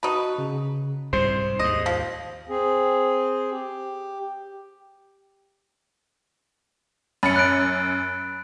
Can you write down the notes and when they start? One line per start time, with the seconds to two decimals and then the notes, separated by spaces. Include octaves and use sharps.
0.03 D#4 F#4 B4 A5
0.38 C#3
1.13 C2 G#2 C3 C5 C7
1.59 D#2 G#2 D#5
1.86 F3
2.49 C4 G#4
3.51 G4
7.23 F#2 B5 A6 C#7
7.36 F#6 D7